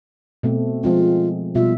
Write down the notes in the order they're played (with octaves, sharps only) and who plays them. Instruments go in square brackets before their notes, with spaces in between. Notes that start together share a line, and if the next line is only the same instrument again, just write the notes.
[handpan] B2 A3 C4
[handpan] F3 G#3 C4 [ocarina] F4
[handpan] B2 G3 E5 [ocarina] F4